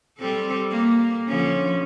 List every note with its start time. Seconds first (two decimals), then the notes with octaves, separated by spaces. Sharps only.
0.18 G3 C4 A4
0.71 A#3
1.28 D3 F3 C#4